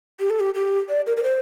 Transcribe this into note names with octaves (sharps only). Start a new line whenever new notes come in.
G4
A4
G4
G4
D5
A#4
A#4
C5